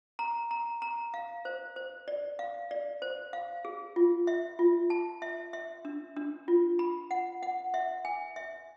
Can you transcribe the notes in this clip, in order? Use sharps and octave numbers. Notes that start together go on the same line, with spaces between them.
A#5
A#5
A#5
F5
C5
C5
D5
F5
D5
C5
F5
G#4
F4
E5
F4
A5
E5
E5
D4
D4
F4
B5
F#5
F#5
E5
G#5
E5